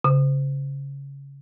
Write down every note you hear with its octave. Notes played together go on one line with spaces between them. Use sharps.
C#3